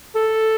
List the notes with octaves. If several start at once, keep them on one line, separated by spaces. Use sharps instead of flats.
A4